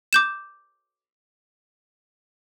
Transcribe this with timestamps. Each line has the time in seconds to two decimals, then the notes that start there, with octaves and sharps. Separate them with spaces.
0.13 D6 G6 E7